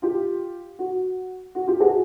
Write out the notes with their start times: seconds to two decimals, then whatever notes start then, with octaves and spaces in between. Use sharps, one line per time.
0.02 F4 G4
0.79 F#4
1.55 F#4
1.67 F4 G4
1.80 F#4 G#4